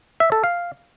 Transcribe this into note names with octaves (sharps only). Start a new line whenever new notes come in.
E5
A4
F5